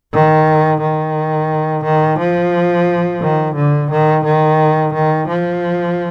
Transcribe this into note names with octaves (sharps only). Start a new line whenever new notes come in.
D#3
D#3
D#3
F3
D#3
D3
D#3
D#3
D#3
F3